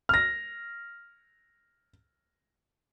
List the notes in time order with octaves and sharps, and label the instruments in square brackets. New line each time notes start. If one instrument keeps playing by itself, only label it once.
[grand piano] F6 A#6